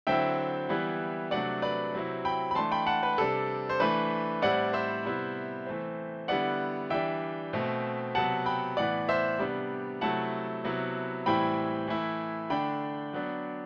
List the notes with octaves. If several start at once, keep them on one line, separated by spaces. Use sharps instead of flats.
D3 F#3 C4 E4 E5 G5
E3 G3 B3 E4
C3 F#3 A3 D4 D5 F#5
B4 D5
C3 F#3 C4 E4
G5 B5
B5
E3 A3 D4 A5 C6
G5 B5
F#5 A5
B4
C3 G3 D4 A4
C5
E3 A3 D4 B4
A2 G3 C4 E4 D5 F#5
C5 E5
C3 G3 B3 E4
E3 A3 C4
D3 G3 B3 E4 D5 F#5
E3 G3 D4 E5 G5
B2 A3 C4
C3 F#3 B3 F#5 A5
G5 B5
A2 E3 B3 D5 F#5
C5 E5
C3 G3 B3 D4
C3 F#3 A3 E4 F#5 A5
C3 F#3 B3 E4
A2 E3 G3 C4 E4 G5 B5
E3 A3 E4
D3 A3 D4 G5 B5
F#3 B3 D4